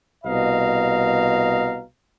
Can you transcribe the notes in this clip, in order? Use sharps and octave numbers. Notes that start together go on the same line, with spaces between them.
C2 B2 D#5 F5 A#5